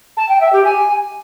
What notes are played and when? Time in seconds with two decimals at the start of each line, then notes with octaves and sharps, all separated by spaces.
0.17 A5
0.29 G5
0.40 E5
0.52 G4
0.64 G#5